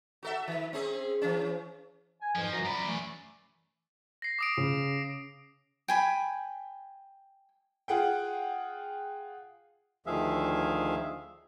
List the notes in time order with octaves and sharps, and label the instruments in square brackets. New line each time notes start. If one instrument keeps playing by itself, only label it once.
[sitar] F#4 A4 E5
D#3
C4 C#4 G#4
E3 C#4
[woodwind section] G#5
[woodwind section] F2 G#2 E3 [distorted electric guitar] F3
[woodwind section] F#2 F#4 A#5
[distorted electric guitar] F#2 D5 [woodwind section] A#5 B5
[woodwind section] E3 A3
[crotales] A#6 C7
D6 D#6 D7
[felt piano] C#3
[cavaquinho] G5 G#5 B5
[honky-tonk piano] F4 G#4 F#5 G5
[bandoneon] D2 D#3 F3 G#4 E5 F5